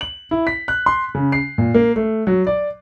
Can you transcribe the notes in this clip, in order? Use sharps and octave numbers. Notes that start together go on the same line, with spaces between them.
F#7
E4
B6
F#6
C6
C#3
C7
A#2
A#3
A3
F#3
D5